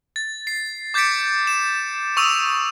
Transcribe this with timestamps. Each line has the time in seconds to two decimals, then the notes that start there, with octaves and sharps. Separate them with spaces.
0.16 A6
0.47 C7
0.94 D6 G6 A6 B6 C#7 D7
1.47 E7
2.17 C#6 D#6 E6 D#7 F7